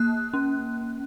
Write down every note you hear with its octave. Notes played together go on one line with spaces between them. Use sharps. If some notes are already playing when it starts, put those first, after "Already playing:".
Already playing: A#3 F#6
C#4